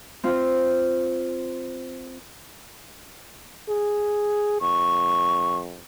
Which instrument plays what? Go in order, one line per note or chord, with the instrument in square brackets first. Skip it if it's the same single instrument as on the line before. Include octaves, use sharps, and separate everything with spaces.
[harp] C4 F4
[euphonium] G#4
[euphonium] F2 [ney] C#6